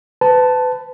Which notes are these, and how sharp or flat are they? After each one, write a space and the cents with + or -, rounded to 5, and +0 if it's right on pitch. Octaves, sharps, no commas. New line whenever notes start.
B4 +30 A5 +0